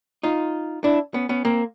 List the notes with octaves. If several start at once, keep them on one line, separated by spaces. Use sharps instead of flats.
D#4 F4
D4 E4
B3 C#4
B3 C#4
A#3 C4